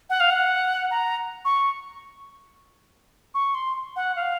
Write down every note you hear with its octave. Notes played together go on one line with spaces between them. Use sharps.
F#5
F5
F#5
A#5
C#6
C#6
C6
F#5
F5